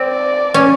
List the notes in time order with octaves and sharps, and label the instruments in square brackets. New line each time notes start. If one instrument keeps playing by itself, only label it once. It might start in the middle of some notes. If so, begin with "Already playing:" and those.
Already playing: [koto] C4 [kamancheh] D5
[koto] C#4